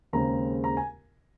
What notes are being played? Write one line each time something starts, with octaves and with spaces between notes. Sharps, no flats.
D#2 C#3 G#3 C4 A#5
A#5
G#5